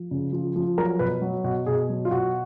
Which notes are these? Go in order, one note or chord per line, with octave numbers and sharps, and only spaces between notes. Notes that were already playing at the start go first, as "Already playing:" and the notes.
Already playing: F3
C#3
F3
F3
F#3 A#4
B2 B4
F#3
B2 F#4
B2 G#4
F#3
F4
B2 F#4